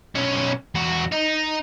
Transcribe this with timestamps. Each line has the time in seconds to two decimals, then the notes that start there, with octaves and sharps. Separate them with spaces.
0.15 B1 C#4
0.75 E2 F#4
1.12 D#4